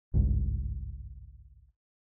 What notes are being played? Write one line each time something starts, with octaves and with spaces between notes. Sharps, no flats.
G#1 C#2 G2